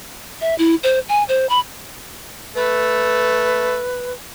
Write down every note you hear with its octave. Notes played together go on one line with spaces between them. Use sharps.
E5
E4
C5
G#5
C5
B5
A3 B4